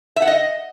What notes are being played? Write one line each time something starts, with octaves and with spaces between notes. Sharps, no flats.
E5
F#5
D#5